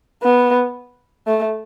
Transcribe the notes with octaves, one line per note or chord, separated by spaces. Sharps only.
B3
A3